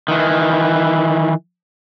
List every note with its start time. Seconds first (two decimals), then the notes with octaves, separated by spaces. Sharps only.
0.08 D#3 E3